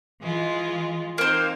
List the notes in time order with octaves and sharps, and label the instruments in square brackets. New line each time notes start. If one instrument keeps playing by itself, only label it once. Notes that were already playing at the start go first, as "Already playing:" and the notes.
[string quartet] E3 G#3 F4
[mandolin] A#3 C5 [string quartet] C4 D#4